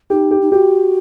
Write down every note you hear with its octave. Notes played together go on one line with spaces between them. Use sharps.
D#4 G4
G4
D#4
F#4 G4